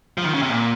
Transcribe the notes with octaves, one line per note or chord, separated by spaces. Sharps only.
F3
D#3
C#3
C3
A#2